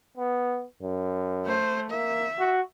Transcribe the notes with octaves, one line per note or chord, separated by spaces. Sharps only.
B3
F#2
A3 C5
A#3 E5
F#4